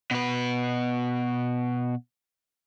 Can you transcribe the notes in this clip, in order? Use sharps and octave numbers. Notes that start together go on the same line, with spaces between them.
B2 B4